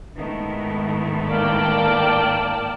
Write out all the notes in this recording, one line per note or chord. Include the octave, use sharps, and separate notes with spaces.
G#2 D#3 G#3 A3 B3 E4
A#3 D5 G5 A5